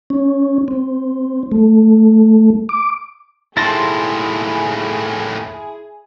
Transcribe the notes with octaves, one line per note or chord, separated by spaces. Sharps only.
C#4
C4
A3
D6
D#2 A2 E4 G#4 A5 C6 A6 A#6